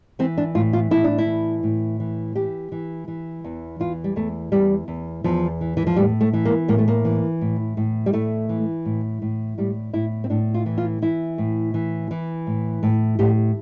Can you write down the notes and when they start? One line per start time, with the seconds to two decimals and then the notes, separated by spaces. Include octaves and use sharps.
0.19 E3 C4
0.38 D4
0.55 A2 F4
0.73 F4
0.91 A2 E4
1.04 D4
1.18 E4
1.27 E3
1.63 A2
2.00 E3
2.36 E3 G4
2.72 E3
3.08 E3
3.44 E2
3.80 E3 F4
4.04 G3
4.16 E2 A3
4.52 E2 G3
4.88 E2
5.24 E2 F3
5.61 E3
5.77 E3
5.87 F3
5.96 A2 G3
6.21 A3
6.33 E3
6.45 A#3
6.68 A2 A#3
6.78 A3
6.88 A#3
7.05 E3
7.41 A2
7.77 A2
8.06 G3
8.13 A2 A3
8.49 E3
8.85 A2
9.22 A2
9.58 A2 G3
9.93 A2 E4
10.24 C4
10.30 A2 D4
10.54 F4
10.66 E3
10.78 F4
11.02 E3 E4
11.38 A2
11.74 E3
12.11 E3
12.47 A2
12.83 A2
13.19 A2 G4